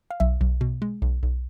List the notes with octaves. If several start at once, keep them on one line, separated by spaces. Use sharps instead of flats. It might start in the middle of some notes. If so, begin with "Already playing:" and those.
F5
B1 E5
B1
B2
G#3
B1
B1